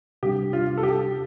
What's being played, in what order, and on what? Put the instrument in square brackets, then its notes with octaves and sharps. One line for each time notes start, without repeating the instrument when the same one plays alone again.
[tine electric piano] C3 G3 D4 [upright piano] G4
[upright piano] F4
A4
G4